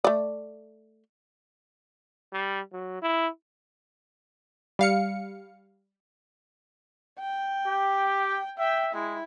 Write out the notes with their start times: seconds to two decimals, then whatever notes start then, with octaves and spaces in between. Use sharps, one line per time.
0.04 A3 D5
2.33 G3
2.72 F#3
3.02 E4
4.79 G3 F5 C#7
7.20 G5
7.67 G4
8.59 E5 G5
8.94 G#3 E4